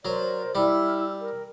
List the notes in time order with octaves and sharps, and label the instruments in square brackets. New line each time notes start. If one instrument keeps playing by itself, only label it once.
[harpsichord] F#3 [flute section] A#4 C5 D5
[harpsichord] G3 [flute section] E4 E6 F6
[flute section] A#4